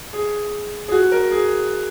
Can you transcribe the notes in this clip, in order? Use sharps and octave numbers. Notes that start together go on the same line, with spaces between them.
G#4
G#4
F#4
A#4
G#4